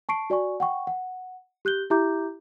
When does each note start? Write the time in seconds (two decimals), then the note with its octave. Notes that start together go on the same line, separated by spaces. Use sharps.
0.09 A5 C#6 C7 D7
0.30 F#4 D5 G#5 C#6
0.60 F#5 G5 C#6
0.87 F#5
1.65 G4 F#6 G6 G7
1.90 E4 G4 E5 A#5 D6 G6